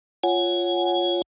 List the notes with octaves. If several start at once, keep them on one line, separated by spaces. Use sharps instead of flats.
F4 C#5 F#5 G#5